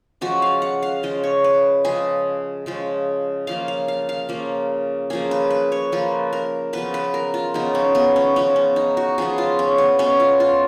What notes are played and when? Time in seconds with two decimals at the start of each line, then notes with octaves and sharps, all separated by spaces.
0.21 C#3 F3 G#3 F#4
0.42 F5
0.62 F#5
0.83 F5
1.03 C#3 F3 G#3 D#5
1.24 C#5
1.44 B4
1.84 C#3 F3 G#3 G#4
2.66 C#3 F3 G#3
3.47 C#3 F3 A#3 F5
3.68 F5
3.88 F5
4.09 F5
4.29 C#3 F3 A#3
5.10 C#3 F3 A#3 G#4
5.31 B4
5.50 B4
5.72 C#5
5.92 C#3 F3 A#3 B4
6.33 A#4
6.73 C#3 F3 B3 B4
6.94 B4
7.14 A#4
7.34 F4
7.54 C#3 F3 B3 D#4
7.75 C#4
7.95 B3
8.16 C#4
8.36 C#3 F3 B3 C#4
8.56 C#4
8.76 D#4
8.97 F#4
9.18 C#3 F3 B3 G#4
9.38 F4
9.59 C#4
9.78 B3
9.99 B2 G#3 B3 C#4
10.20 F4
10.40 F4